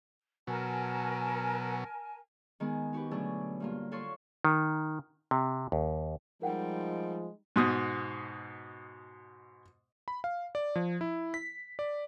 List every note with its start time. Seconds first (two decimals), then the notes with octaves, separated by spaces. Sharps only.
0.47 B2 F#3 A#4 G#5 A5
2.60 D#3 G#3 B3 G#4
2.93 D#4 F#4 G4 B4
3.11 B2 D3 F#3 A3 D4 G#4
3.60 G2 A#3 F4
3.92 F4 F#4 A4 C#5 C6 C#6
4.45 D#3
5.31 C3
5.72 D#2
6.42 F3 G3 G#3 D#4 A#4 F#5 G5
7.56 G#2 B2 D#6
10.08 B5
10.24 F5
10.55 D5
10.76 F3
11.01 E4
11.34 B6
11.79 D5